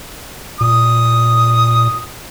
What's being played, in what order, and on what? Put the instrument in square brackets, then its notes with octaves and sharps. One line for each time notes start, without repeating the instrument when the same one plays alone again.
[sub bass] A#2 [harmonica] D#6